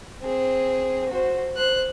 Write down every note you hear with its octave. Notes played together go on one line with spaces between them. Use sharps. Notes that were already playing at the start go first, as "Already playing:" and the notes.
C4 G#4
F#4 C5
C5 F#6